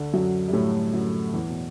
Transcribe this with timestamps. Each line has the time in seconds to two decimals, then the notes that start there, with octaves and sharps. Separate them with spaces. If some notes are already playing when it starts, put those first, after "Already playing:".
Already playing: D2 D3
0.13 F#2 F#3
0.48 G3
0.53 A2 A3
0.93 F#2 F#3
1.33 E2 E3
1.49 B2